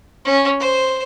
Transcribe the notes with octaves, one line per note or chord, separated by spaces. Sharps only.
C#4
C5